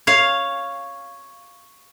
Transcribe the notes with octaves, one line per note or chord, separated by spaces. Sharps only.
C#5 F5